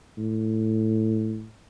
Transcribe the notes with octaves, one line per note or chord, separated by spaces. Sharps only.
A2